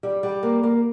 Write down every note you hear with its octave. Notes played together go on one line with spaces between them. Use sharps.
G3
G3
A#3
A#3